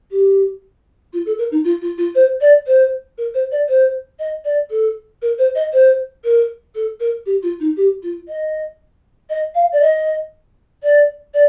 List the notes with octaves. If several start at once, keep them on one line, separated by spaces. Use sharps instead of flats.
G4
F4
A4
A#4
D#4
F4
F4
F4
C5
D5
C5
A#4
C5
D5
C5
D#5
D5
A4
A#4
C5
D#5
C5
A#4
A4
A#4
G4
F4
D#4
G4
F4
D#5
D#5
F5
D5
D#5
D5
D5